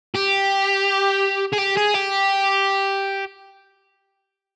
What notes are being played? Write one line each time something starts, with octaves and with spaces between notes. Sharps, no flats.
G4
G#4
G4
G#4
G4